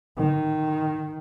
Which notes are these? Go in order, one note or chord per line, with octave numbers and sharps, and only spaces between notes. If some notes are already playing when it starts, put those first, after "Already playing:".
D#3